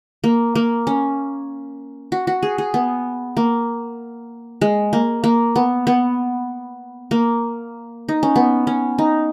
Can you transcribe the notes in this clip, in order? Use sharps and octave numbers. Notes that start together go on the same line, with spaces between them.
A#3
A#3
C#4
F#4
F#4
G#4
G#4
B3
A#3
G#3
A#3
A#3
B3
B3
A#3
D#4
C#4
B3
C#4
D#4